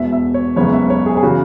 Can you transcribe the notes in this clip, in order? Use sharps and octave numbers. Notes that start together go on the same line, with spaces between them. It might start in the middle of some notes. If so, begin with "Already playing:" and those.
Already playing: E1 E2 B2 E5
E5
C#5
F#1 E2 C#3 G#3 B3 C#5
E5
C#5
G#4
G#4
C#3 E3 F#4